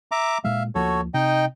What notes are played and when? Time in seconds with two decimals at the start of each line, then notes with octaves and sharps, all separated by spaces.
0.12 E5 A#5 D6
0.44 A#2 G#3 E5 F5
0.75 D2 F3 A#3 F#4 A4 C#5
1.14 C3 D#4 D#5 G5